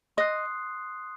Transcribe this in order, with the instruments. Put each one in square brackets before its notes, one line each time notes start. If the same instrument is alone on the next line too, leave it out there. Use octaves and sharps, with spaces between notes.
[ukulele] D#5 [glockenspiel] C6 D#6 F#6 C7